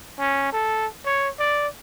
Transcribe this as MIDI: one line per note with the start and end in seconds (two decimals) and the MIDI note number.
0.19 0.48 61
0.52 0.87 69
1.06 1.29 73
1.39 1.68 74